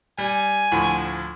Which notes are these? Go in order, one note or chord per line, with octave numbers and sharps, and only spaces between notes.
G3 G#5
D2 A2 F3